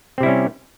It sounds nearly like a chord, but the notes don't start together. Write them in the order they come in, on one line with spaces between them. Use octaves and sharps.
C4 C3 E4 G3 C#4